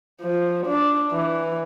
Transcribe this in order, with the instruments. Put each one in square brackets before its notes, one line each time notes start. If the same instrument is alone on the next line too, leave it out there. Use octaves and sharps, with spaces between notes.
[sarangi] F3
D4
E3